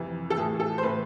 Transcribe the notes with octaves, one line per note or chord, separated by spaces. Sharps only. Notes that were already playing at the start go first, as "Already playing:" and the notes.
Already playing: F2 C3 E3
A4
A2 E3 G#4
A4
C5
A2 E3 B4